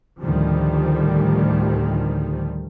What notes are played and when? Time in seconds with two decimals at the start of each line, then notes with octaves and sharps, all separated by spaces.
0.19 D2 A2 D#3 F3 G3